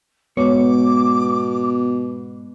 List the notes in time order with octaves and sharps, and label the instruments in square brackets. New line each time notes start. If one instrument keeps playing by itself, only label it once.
[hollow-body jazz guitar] G#2 C#5 [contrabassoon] B2 [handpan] B3 [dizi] D6